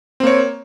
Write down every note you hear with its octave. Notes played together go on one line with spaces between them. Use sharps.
A#3 C4 C#5